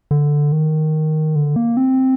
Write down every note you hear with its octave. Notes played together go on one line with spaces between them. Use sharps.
D3
D#3
D3
A#3
C4